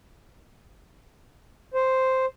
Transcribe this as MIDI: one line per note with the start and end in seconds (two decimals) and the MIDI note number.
1.74 2.26 72